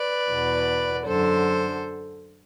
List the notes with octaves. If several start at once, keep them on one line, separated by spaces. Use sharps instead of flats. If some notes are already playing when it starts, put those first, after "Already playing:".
Already playing: B4 D5
E2 B2
F#2 D3 A4 C5